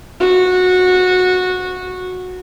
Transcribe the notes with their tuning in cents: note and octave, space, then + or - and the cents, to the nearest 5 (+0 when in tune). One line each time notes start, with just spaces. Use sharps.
F#4 -15